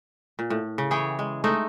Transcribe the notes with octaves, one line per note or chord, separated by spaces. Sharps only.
A#2
A2
C#3
E3 G#4 C#5 G5
G#3
G#3 A3 D#4